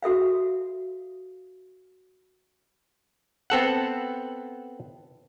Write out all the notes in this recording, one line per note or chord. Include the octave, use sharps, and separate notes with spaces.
F#4 A4 E5 F5
B3 C4 A4 F#5